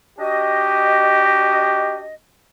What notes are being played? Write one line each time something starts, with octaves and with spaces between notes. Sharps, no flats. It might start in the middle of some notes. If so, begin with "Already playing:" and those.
D4 F#4 G4 D#5